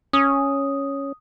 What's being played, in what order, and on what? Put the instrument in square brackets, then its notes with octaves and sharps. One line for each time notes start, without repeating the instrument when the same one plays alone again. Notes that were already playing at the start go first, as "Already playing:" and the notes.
[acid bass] C#4 [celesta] D#6